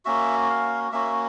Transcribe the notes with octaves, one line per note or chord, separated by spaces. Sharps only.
A#3 C#4 F#4 E5
F5
A#3 C#4 F#4 E5